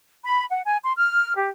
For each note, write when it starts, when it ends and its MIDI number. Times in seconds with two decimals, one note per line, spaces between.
0.25 0.44 83
0.50 0.61 78
0.64 0.77 80
0.83 0.92 84
0.98 1.35 89
1.35 1.49 67